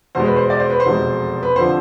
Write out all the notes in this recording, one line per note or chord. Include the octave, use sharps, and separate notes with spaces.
E2 B2 G#3 C5
B4
C5
D5
C5
B4
C5
F1 E2 B2 G#3
B4
F1 D3 F3 C5